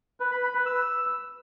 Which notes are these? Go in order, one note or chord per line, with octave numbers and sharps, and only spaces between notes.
B4
B5
B5
B4
E6